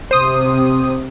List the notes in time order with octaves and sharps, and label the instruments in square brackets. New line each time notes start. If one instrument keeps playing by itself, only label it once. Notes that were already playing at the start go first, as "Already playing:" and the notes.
[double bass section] C3 [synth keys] C5 D#6